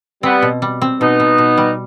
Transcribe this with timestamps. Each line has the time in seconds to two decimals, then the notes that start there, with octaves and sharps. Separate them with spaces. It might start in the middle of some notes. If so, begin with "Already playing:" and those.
0.23 G3 B3 C4
0.42 B2
0.62 G3
0.82 C4
1.00 B2 B3 D#4
1.20 B2
1.38 B2
1.57 G3